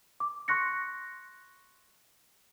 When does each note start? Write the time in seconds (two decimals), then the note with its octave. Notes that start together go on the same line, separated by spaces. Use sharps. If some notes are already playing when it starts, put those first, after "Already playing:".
0.20 D6
0.48 C6 C#6 F#6 A#6 C#7